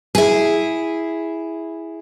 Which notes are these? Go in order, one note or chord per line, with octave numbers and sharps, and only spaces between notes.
E4 G#4